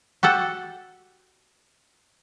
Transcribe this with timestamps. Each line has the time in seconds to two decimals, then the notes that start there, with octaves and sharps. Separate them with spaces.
0.23 F#4 G4 A4 F#5